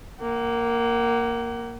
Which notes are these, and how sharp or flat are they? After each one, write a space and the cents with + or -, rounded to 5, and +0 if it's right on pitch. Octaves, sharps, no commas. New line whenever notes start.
A#3 +0 F#5 +40